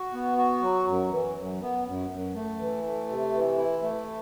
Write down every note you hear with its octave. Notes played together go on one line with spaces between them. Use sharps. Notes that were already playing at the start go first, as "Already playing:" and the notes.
Already playing: F#4
B3
F#4
F#3
F#2
E3
F#2
B3
F#2
F#2
A3
E3
A3
C3
E3
E4
A3